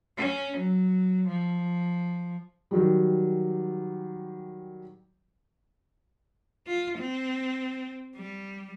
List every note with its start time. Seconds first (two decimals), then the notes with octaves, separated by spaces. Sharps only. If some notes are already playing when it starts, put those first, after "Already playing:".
0.17 C#4
0.58 F#3
1.28 F3
2.71 D#3 F#3 G3
6.67 F4
6.99 C4
8.16 G3